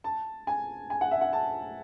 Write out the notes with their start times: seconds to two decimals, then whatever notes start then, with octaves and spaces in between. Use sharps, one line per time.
0.04 A5
0.47 G#5
0.90 G#5
1.01 F#5
1.11 E5
1.21 F#5
1.33 A5